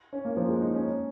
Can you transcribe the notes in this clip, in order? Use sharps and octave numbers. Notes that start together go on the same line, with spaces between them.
C#4
A#3
F3
G#3
D#4
C#4